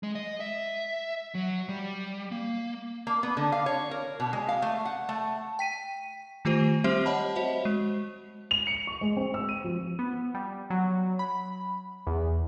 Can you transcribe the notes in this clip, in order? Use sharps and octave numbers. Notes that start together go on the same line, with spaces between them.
G#3
D#5
E5
F#3
G3
A#3
A#3
B3
D3
F5
C#5
A#4
B2
G#3
F5
A3
F#5
A3
G5 B6 D#7
D#3 A3 F4 G4 C5 D#7
G3 C4 G4 C5 E5
C#5 D#5 F#5 A5 B5
F#4 C5 D#5 E5
G#3
F7
C#7
C#6
G#3
C4
E6
D#7
F3
B3
G3
F#3
B5
E2